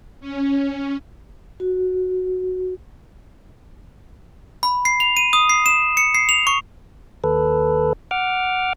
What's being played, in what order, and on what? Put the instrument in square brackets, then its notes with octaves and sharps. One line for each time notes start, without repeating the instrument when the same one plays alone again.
[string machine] C#4
[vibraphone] F#4
[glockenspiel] B5
C7
F7
D#7
D#6
C7
E7
C#7
C7
F7
C#6
[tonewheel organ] D#2 A4 B4
F#5 D6 F6